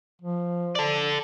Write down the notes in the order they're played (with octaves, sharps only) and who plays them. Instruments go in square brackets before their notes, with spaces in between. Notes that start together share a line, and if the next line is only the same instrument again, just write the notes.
[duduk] F3
[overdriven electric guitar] A4 D5